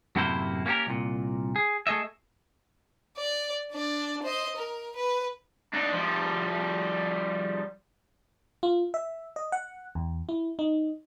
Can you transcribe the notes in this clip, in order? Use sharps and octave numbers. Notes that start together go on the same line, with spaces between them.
F#2 A2 C3 A#3 E4 C5
A#3 C#4 F#4 G4 A#4
C2 A#2
G#4
A3 G#4 D#5 E5
D5
D4 D5
C5 D#5
A#4
B4
D4 D#4
F3 G3
F4
E5
D#5
F#5
E2
E4
D#4